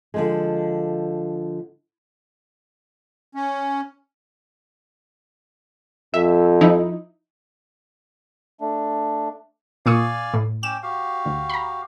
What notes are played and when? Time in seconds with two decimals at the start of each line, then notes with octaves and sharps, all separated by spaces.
0.14 D3 F3 G#3
3.35 C#4
6.14 F2 E5
6.61 F3 D#4 E4
8.61 A3 D4
9.86 A#2 D5 F5 G#5 C#6 D#6
10.34 A2
10.63 C#4 G5 D6 E7
10.83 F#4 G4 F5
11.26 D2
11.50 A#5 B5